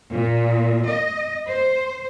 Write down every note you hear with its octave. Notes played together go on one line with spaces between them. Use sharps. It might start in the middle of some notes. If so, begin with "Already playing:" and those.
A#2
D#5
C5